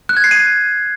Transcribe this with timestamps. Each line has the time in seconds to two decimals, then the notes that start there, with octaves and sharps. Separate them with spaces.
0.09 F#6
0.17 G#6
0.24 C7
0.31 D#7